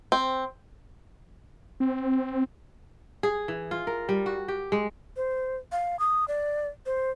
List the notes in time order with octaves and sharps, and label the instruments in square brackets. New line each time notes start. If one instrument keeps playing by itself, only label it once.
[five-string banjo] C4
[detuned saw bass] C4
[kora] G#4
E3
F4
A#4
G3
F#4
G4
G#3
[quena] C5
F5
D#6
D5
C5